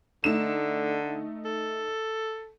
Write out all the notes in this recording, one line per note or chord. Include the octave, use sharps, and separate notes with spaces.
D3 A3 D#4 E7
A4